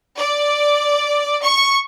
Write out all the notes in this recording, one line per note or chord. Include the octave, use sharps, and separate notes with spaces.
D5
C#6